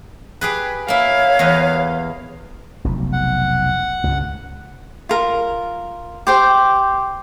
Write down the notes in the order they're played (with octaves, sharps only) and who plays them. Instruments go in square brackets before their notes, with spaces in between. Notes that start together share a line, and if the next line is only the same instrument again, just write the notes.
[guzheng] G4 G#4 B4
[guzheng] A#3 E4 [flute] C#5 [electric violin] F5
[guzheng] E2 B4 D#5
[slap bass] F1 B1
[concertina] F#5
[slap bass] C#2 G2
[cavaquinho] F4 A#4
G4 C5 G5